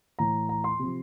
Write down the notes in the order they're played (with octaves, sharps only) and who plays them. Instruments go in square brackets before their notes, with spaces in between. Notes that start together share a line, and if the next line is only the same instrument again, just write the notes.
[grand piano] A2 E3 A#5
A#5
C6
C3 F3